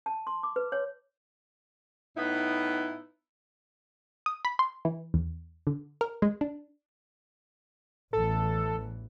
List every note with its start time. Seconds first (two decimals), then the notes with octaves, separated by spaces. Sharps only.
0.06 A5
0.27 C6
0.43 D6
0.56 B4
0.72 C#5
2.16 A2 B3 D#4 E4
4.26 D#6
4.45 B5
4.59 C6
4.85 E3
5.14 E2
5.67 D3
6.01 A#4
6.22 G#3
6.41 D4
8.13 A1 E2 E3 A4